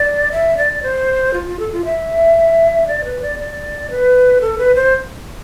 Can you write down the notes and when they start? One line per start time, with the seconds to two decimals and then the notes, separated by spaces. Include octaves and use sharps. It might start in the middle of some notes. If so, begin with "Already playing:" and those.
Already playing: D5
0.32 E5
0.57 D5
0.83 C5
1.34 F4
1.47 F4
1.59 A4
1.73 F4
1.85 E5
2.88 D5
3.04 B4
3.22 D5
3.39 D5
3.90 B4
4.41 A4
4.58 B4
4.75 C5